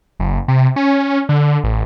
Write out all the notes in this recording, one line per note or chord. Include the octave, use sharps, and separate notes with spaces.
F#1
C3
C#4
D3
A1